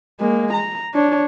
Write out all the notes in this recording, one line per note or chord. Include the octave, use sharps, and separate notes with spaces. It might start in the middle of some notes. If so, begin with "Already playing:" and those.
G#3 A#3
A#5
D4 C#5